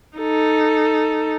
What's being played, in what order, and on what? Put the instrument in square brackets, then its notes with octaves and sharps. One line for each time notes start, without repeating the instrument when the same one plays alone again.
[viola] D#4 A4